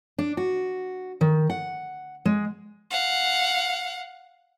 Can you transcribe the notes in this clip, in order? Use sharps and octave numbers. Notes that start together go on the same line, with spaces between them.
D4
F#4
D#3
F#5
G#3
F5 F#5